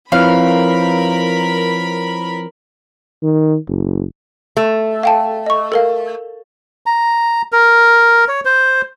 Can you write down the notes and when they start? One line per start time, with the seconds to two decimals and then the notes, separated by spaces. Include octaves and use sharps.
0.12 F3 C4 E4 A#4 B4 C#5 F5 B5
3.23 D#3
3.68 F#1
4.57 A3
5.03 F5 G5 A5
5.46 D#5 C#6
5.72 A4 A#4 F5
6.86 A#5
7.52 A#4
8.28 C#5
8.45 C5